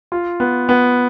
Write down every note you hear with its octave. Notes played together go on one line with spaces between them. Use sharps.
F4
B3
B3